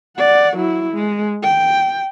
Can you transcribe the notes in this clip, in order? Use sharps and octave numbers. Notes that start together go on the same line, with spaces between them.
D5 F#5
F#3 E4
G#3
G5